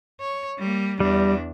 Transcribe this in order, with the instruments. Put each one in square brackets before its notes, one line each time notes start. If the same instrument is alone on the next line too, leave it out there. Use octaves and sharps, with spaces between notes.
[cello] C#5
G3 A#3
[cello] E2 D4 [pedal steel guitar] G3